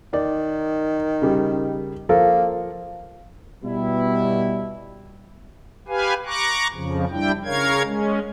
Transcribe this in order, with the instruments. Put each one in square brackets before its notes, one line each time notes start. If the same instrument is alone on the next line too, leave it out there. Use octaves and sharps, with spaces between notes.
[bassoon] D#3 [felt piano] D5
[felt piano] C#3 G3
[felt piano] F3 A4 A#4 [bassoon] A#3
[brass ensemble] B2 G3 E4
[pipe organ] G4 B4 F5 G#5
A#5 C#6 D6 F#6
F2 C#3 F3
G3 D4 E4 G5
C#3 A#4 C#5 F5 G#6
G#3 C#4